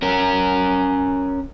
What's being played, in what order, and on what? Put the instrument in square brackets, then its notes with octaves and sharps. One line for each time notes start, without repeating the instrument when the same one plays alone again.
[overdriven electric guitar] C#4 A#4